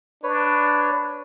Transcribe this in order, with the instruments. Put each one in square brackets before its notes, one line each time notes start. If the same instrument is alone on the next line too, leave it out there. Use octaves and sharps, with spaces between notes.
[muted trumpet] D4 [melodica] B4 C#5